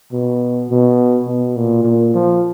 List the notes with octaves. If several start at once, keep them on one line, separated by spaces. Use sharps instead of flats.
B2
B2
B2
A#2
A#2
F3